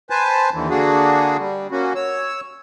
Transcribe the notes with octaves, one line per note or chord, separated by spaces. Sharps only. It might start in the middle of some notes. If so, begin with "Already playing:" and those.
B4 C5 G#5 A5
D#2 D3 E3
D3 A#3 D4 F#4 G#4
G3
A#3 C#4 F#4
C#5 E6